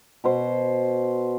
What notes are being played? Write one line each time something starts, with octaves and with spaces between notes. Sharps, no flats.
B2 C5